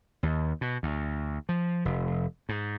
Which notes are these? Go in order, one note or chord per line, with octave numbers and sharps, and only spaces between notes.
D#2
B2
D2
F3
F1
G#2